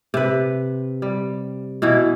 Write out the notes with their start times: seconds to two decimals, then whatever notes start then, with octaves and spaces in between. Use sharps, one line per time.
0.14 C3 B4
1.02 G3
1.82 B2 E3 E4